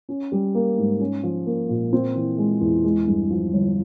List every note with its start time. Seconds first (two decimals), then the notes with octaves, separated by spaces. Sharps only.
0.09 C#4
0.32 G3
0.55 A#3
0.78 G#2
1.00 C#4
1.23 F3
1.46 A#3
1.69 A#2
1.93 C4
2.15 E3
2.38 G#3
2.61 E2
2.84 G#3
3.07 G2
3.31 F3
3.53 G1